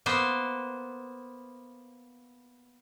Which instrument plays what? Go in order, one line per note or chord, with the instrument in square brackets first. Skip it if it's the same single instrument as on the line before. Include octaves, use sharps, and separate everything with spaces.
[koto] A#3 B3 C5